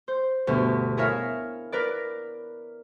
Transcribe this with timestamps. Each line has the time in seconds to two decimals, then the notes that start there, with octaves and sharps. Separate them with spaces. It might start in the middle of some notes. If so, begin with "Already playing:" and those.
0.08 C5
0.47 D2 G2 B2
0.97 E4 G#4 A#4 C#5 E5 F5
1.72 A#4 B4 D5